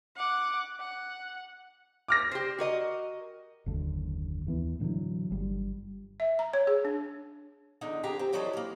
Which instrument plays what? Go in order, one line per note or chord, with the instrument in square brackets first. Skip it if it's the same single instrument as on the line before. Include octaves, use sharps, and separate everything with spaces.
[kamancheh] F#5 D6
F#5
[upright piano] D6 F6 A#6
[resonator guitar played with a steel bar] G4 C5
F#4 A#4 D#5
[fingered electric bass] F#1 D#2 D3
D#2 E3 B3
A2 D3 E3 F#3
G1 G3
[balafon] E5
A#5
C#5
G#4
D4
[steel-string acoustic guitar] E2 D3 D#4
F2 D3 G4 G#4 A#5
C4
E3 F#3 G3 C4 D#4 A4
A#3 A#4